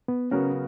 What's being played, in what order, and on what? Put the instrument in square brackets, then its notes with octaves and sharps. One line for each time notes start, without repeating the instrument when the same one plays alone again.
[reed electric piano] B3
[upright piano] C#3 F#3 B3 F#4 A#4 [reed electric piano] C#4